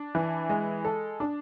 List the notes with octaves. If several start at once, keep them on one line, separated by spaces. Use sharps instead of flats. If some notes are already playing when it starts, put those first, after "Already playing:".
Already playing: D4
E3
G#3
A4
D4